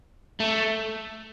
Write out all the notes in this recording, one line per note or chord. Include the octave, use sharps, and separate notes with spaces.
A3